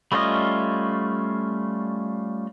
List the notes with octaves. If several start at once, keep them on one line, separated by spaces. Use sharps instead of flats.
G3 A3 C#4 F4 D#5